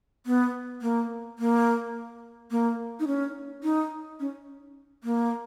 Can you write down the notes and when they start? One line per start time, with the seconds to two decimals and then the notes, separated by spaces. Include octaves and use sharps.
0.26 B3
0.82 A#3
1.39 A#3
2.51 A#3
3.00 D#4
3.07 C#4
3.63 D#4
4.20 C#4
5.04 A#3